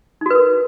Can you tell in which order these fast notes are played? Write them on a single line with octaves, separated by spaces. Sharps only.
D#4 F#4 B4 A#4